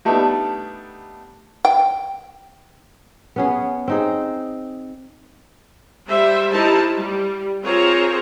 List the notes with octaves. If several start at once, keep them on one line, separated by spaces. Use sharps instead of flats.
G3 A3 B3 D4 D#4
G5
B3 C#4 G#4
C4 D#4 G#4
G3 C5 E5
D#4 E4 G4 A#4 C5 A5
G3
C4 F4 G#4 A#4 C5 C#5